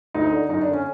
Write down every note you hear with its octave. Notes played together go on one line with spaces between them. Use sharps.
D2 D#4
D3
F#2 D#4
D4
D3
C#4